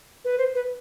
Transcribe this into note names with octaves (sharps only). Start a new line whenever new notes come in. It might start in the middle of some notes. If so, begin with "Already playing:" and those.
B4
C5
B4